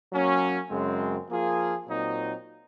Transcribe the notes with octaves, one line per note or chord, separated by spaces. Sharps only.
F#3 A#3 C#4
F#2 C#3 G#3 C4
F3 A#3 F4 G#4
A#2 F#3 C4 D#4